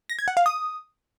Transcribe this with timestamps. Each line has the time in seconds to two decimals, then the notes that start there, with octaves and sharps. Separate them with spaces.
0.09 A#6
0.19 G#6
0.28 F#5
0.37 F5
0.46 D#6